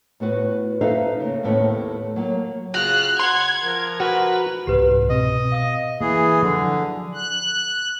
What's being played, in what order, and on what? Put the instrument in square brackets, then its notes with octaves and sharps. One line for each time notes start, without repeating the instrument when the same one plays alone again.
[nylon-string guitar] A2 B3 F#4 B4
D#4 A4 B4 C5 E5 F5
C#3 A#3
D#2 A2 A3 B3 C4 C#5
F#3 A#3
[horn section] C#3 F4 [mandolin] F#4 [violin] F6 F#6
[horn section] F#5 [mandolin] C6 [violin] G#6
[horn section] F3 A#4
[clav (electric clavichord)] F#4 [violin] B4
[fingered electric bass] C2 G#2 [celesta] G4 B4
[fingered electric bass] B2 C4 [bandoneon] D#5
[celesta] F5 D#6
[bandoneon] E3 G#4 [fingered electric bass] A#3
[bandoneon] D3 [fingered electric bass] F3 F#3
[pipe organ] F#6